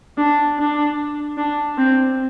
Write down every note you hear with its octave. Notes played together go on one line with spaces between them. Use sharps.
D4
D4
D4
C4